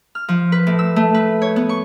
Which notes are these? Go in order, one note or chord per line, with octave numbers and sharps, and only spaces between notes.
F6
F3
B4
A2
E6
A3
B4
C#5
B3
C#6